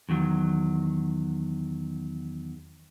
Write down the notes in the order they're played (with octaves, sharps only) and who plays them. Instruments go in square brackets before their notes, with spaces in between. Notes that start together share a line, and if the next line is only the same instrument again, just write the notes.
[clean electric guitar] E2 D#3 F#3